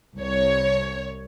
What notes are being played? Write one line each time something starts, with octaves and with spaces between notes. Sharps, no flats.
C2 C#5